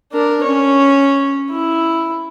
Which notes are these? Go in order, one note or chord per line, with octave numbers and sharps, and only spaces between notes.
D4 A#4
C#4 C#5
E4